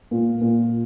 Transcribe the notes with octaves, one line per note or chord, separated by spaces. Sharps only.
A#2
A#2